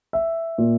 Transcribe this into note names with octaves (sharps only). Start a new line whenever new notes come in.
E5
A#2